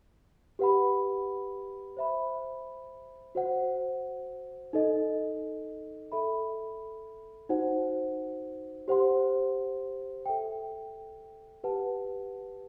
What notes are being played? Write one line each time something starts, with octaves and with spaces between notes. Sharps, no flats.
G4 B4 F#5 B5
C5 E5 B5
F#4 C5 F#5
D#4 A4 D#5
A4 E5 B5
D#4 F#4 C5 F#5
G4 C5 F#5 C6
A4 E5 G5
G4 B4 F#5 A5